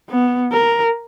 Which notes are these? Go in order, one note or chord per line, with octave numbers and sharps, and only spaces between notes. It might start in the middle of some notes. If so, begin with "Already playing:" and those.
B3
A#4